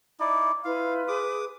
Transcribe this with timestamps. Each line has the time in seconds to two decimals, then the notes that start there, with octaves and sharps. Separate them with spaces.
0.20 D#4 E4 D5
0.65 E4 F4 B4 F5
1.08 G#4 D6 D#6